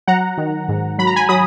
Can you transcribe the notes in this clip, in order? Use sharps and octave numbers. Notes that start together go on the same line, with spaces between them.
F#3 F#5 A#5
D#3
G#2
F#3 B5
A#5
G#5 B5
F#3 B5 D#6